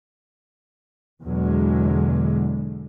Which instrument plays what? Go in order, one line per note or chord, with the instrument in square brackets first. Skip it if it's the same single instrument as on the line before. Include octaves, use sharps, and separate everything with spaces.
[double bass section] E2 B2 D3 F#3 G#3